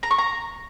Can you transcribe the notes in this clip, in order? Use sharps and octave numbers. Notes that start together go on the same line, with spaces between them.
A#5
C#6
A#5